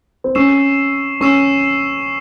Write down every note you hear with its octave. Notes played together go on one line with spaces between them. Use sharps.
C4
C#4 C#6 E6 C7 E7
C#4 C#6 E6 C7 E7